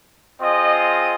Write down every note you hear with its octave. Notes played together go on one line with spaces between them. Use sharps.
C4 F4 G#4 D#5